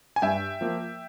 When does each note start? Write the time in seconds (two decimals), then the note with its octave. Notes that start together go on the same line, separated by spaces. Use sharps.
0.16 G#5
0.22 G2 E5 G5
0.61 F3 A#3